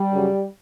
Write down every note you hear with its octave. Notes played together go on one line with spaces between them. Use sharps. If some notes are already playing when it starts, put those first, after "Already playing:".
Already playing: G3
F#2 C#3 F#3